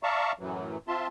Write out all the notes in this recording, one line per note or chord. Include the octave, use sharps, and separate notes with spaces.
D5 E5 F5 A5 A#5 C#6
F#2 A2 E3 F#3
C4 F4 E5 A5 C6